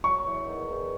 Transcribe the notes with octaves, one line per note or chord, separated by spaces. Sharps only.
F#3 C#6
E2
D#3
E2